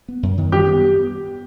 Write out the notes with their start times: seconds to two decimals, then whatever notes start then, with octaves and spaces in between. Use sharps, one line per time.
0.08 B3
0.23 F#2
0.38 D#3
0.52 G3 G4
0.67 B3